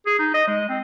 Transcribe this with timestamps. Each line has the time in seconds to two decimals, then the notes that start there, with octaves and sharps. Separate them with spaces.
0.06 G#4
0.19 D#4
0.34 D#5
0.47 G#3
0.69 C4